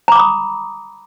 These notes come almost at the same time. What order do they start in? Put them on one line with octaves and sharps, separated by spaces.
A#5 D6 B5 D#6